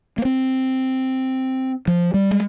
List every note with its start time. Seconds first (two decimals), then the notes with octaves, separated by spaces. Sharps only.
0.18 A#3
0.25 C4
1.87 F3
2.14 G3
2.31 G#3